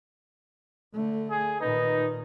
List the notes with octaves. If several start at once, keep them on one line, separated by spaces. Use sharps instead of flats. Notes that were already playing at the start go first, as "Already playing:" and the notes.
D3 A3
G#4
A#2 D#3 D#4 B4